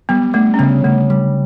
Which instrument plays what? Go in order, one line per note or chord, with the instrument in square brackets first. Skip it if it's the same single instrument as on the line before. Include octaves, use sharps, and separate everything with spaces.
[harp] G3 [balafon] B3
[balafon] A3 [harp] D4
[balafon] C#4
[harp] C#3 [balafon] B3
[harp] C#3 [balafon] A3
[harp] G3